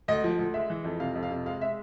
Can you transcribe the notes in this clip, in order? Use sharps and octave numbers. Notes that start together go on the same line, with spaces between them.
D2 D#5
F3
D2
G#3 E5
E3
F2
C3 F5
F2
F5
C3
G#3 F5
G#3 E5